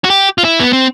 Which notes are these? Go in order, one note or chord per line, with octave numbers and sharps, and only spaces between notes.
F#4
G4
F4
E4
B3
C4